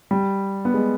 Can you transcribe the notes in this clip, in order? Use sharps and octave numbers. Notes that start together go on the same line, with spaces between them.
G3
B3
G#3